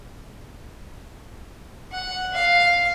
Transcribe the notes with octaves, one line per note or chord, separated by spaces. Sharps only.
F#5
F5